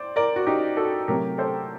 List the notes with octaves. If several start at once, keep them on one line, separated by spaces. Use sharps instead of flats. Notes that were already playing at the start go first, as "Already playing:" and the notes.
Already playing: C5 D5
A#4 D5
F#4
D#4 G4
F#4 A4
C3 F#3 A3 G4 A#4
A4 C5